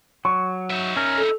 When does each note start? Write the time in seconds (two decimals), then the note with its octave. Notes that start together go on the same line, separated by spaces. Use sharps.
0.25 F#3 C#6
0.70 D#4 E5
0.96 C#4 A#4
1.18 A4